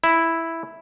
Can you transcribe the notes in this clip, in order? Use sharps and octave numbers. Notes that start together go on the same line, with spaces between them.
E4